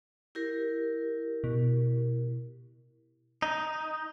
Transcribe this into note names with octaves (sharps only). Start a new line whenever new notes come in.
E4 G4 A#4
B2
D#4